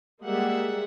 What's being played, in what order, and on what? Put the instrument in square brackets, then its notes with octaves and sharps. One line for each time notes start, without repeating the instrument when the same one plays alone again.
[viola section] G3 G#3 A#3 G#4 E5 F#5